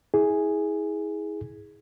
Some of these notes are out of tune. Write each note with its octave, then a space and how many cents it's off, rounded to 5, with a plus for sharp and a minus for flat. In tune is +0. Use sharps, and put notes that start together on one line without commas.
E4 -35 G#4 +0